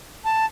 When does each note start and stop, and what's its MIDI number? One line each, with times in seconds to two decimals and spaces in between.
0.25 0.45 81